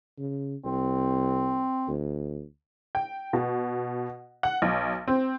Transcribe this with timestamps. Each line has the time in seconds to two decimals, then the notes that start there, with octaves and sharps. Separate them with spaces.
0.18 C#3
0.65 C2 C4
1.88 D2
2.95 G5
3.33 B2
4.43 F#5
4.62 B1
5.08 C4